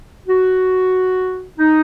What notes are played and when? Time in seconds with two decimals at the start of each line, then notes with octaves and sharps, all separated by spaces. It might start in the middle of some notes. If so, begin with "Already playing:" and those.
0.27 F#4
1.58 D#4